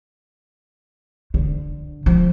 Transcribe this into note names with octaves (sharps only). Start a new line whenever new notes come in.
D3
F3